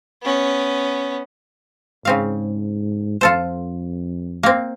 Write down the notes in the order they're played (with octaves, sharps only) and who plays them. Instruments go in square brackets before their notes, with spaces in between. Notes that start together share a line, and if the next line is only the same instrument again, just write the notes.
[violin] B3 C#4
[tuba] G#2 [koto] C#3 C4 F5
[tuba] F2 [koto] F4 A4 C5
[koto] A#3 C4